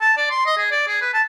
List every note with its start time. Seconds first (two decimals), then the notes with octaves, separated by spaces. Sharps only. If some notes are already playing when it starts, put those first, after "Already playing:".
0.01 A5
0.17 D5
0.30 C6
0.46 D#5
0.57 G#4
0.71 D5
0.87 G#4
1.01 B4
1.14 A5